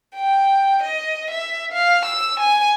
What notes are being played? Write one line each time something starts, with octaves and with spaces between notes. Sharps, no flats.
G5
D#5
E5
F5
E6
G#5